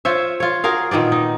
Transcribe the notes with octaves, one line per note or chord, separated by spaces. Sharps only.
F4 C5 C#5 E5
F4 C#5
F#4 G#4 A#4 F5
A#2 D#3 B3 D5
D#4